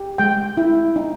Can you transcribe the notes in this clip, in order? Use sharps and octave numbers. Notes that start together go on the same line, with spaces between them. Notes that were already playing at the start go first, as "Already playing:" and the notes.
Already playing: G4
G#3 G5
E4
D#4